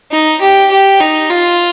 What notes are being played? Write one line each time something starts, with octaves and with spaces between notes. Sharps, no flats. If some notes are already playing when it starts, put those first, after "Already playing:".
D#4
G4
G4
D#4
F4